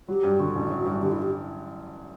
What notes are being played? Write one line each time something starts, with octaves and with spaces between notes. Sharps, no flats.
F#3 G4
G2
D3 F#4
A1
F#3
G2
D3 G4
E4
G4